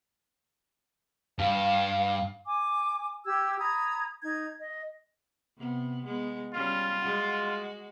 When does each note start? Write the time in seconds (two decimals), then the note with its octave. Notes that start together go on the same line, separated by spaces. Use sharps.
1.39 G2 F5
2.46 G#5 D6
3.26 G4 E6 G#6
3.58 A#5 B5 D#6 G#6
4.22 D#4 G#6
4.58 D#5
5.57 C3 B3
6.05 G#3 B3
6.54 G3 C#4 F4
7.00 G#3 F#4